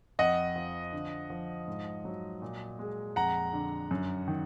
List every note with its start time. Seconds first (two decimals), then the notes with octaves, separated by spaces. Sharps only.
0.19 F2 D#5 F#5
0.56 F3
0.93 D3
1.30 F3
1.68 G#2
2.05 F#3
2.42 A#2
2.79 G#3
3.16 F2 F#5 A#5
3.53 D3
3.91 F#2
4.28 D#3